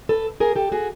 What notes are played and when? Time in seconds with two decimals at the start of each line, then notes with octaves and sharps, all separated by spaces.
0.09 A4 B4
0.40 G#4 A#4
0.56 G4 A4
0.72 F#4 G#4